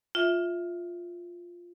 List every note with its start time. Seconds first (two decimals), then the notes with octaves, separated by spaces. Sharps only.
0.15 F4 E5